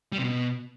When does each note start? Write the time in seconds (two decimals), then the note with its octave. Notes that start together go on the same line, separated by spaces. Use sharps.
0.12 G3
0.18 C3
0.24 B2